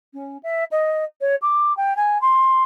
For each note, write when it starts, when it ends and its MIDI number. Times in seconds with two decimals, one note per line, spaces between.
0.14 0.38 61
0.43 0.64 76
0.71 1.04 75
1.21 1.36 73
1.42 1.75 86
1.77 1.96 79
1.97 2.20 80
2.21 2.64 84